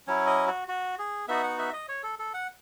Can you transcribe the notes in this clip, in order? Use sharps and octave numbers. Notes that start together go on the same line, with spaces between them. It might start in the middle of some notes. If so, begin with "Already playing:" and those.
F#3 C#4 E4 C#5
D#5
F#4
F#4
G#4
B3 D#4 F#4 E5
F#5
E5
D#5
C#5
A4
A4
F#5